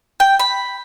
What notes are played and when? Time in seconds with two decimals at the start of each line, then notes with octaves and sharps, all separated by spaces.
0.20 G5
0.39 B5